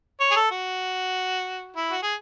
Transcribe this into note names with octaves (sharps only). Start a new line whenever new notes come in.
C#5
G#4
A4
F#4
E4
F#4
G#4